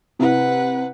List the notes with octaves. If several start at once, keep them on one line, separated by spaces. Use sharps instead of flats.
C3 E4 B4 F#5